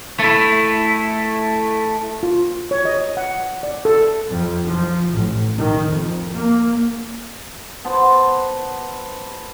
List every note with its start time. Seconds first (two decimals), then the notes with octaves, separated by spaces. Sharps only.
0.20 A3 E4
2.23 F4
2.71 C#5
2.85 D#5
3.17 F#5
3.63 D5
3.85 A4
4.28 F2
4.65 F3
5.12 A1
5.58 D#3
5.89 F2
6.33 A#3
7.85 B3 C5 A5